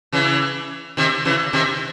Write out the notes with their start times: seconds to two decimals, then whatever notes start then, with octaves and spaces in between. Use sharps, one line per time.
0.12 C#3 E3
0.97 C3 D#3
1.25 C#3 E3
1.53 C3 D#3